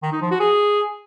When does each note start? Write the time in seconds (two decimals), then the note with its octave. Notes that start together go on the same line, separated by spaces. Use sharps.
0.03 D#3
0.12 D#4
0.22 F3
0.31 F#4
0.40 G#4